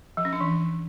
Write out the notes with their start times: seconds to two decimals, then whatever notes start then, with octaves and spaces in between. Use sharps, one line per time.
0.17 F3
0.25 C#4
0.33 D4
0.41 E3